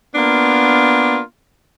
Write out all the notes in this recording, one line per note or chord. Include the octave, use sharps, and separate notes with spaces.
A#3 B3 D4 F4